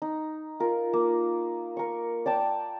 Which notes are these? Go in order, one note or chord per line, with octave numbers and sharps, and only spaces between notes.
D#4
F4 A#4
A#3
A#4 C#6
D5 G5 A5